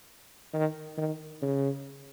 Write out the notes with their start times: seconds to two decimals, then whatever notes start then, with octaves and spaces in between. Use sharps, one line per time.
0.53 D#3
0.98 D#3
1.42 C#3